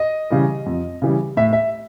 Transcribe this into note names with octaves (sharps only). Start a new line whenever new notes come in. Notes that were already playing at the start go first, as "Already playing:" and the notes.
Already playing: D#5
C#3 E3 G3
F2
C#3 E3 G3
A2 E5
E5